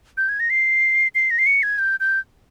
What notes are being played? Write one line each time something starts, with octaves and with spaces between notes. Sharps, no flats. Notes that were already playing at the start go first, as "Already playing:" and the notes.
G6
G#6
A#6
C7
C7
A#6
C7
C#7
G#6
G6
G6